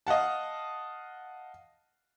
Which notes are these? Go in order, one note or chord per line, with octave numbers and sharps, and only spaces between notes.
D#5 F5 F#5 A5